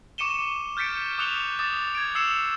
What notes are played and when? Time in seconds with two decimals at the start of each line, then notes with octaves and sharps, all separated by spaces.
0.18 C#6 D6 C#7 D#7 E7 G7
0.77 F6 G6 A6 B6 C#7 D7
1.18 D6 D#6 F#6 C#7 F7 G7
1.59 D6 D#6 A6
1.95 G#6 D7
2.15 D#6 E6 C7 C#7 E7 F7